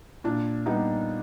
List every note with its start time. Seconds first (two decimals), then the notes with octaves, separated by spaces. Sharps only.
0.24 A#2 D4
0.66 G3 B3 D#4